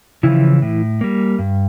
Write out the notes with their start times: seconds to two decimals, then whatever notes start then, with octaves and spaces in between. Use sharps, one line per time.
0.23 C#3 E3 F3 E4
0.62 A2
1.01 G3 A#3
1.39 G2